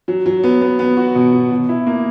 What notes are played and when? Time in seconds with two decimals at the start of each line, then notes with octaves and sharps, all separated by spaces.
0.08 F#3
0.26 F#3
0.44 B3
0.62 B3
0.79 B3
0.97 F#4
1.15 B2
1.33 B2
1.51 B2
1.69 E4
1.87 A#3